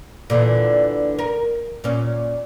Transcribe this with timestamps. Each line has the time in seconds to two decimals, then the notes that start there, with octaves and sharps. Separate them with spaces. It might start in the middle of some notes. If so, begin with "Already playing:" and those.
0.30 A#2 D3 E3
1.19 A#4
1.84 A#2 C#4